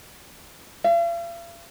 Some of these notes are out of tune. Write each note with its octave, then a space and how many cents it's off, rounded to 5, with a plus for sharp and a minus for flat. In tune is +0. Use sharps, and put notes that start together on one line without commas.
F5 -45